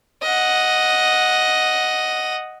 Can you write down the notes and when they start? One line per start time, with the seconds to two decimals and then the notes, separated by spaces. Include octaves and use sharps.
0.22 D#5 F#5